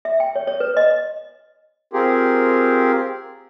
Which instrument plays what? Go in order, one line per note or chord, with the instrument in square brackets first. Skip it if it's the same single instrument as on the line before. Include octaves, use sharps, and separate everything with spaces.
[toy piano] E5
G5
C#5
C#5
B4
D#5
[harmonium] C4 F4 G4 G#4 A#4